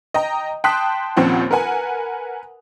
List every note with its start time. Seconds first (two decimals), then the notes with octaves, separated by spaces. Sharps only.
0.14 D#5 G5 A#5
0.64 G5 A5 C6 D#6 F#6 B6
1.17 A#1 D#2 F3 C4 C#4 F#5
1.51 A#4 B4 F#5 G#5